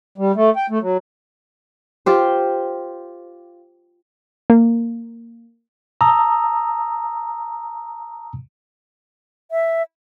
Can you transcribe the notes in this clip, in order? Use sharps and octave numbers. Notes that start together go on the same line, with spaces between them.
G3
A3
G5
A3
F#3
F4 G4 C5
A#3
A5 A#5 D#6 E6
E5